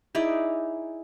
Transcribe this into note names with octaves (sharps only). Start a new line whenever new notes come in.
D#4 E4 G#4 D5